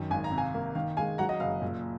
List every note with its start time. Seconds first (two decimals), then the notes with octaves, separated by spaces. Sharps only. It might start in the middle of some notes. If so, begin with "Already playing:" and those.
Already playing: F#2 D#3
0.10 G#1 G#5
0.24 A#5
0.31 C3
0.38 F5 G#5
0.54 A#3
0.75 D#3 F5
0.97 G#3 F5 G#5
1.18 F#3 F#5 A#5
1.29 D#5 F#5
1.40 F#1 F5
1.62 A#2